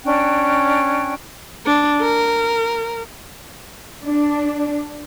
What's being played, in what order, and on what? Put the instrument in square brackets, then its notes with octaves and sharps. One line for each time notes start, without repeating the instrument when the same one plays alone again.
[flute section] C#4 D4 G5 F#6
[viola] D4
A#4
[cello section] D4